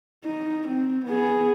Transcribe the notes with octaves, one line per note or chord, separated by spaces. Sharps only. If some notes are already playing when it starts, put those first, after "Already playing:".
D#4
C4
B3 G#4